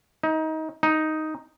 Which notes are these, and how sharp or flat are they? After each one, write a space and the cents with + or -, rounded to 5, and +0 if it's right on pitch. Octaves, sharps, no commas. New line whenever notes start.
D#4 +25
D#4 +5